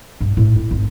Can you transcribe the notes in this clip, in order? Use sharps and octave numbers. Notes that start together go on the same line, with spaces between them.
G2
A2
E4
G#1